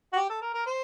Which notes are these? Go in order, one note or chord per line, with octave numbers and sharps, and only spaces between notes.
F#4
G4
A4
A#4
A#4
C5